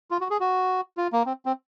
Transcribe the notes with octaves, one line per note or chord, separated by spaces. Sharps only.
F4
F#4
G#4
F#4
F4
A#3
C4
C4